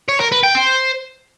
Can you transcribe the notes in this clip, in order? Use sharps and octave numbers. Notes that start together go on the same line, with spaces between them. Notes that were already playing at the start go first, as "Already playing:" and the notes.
C#5
A#4
B4
G5
C5